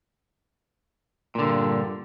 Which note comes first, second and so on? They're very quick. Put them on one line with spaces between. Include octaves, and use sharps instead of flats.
A#2 D3 G2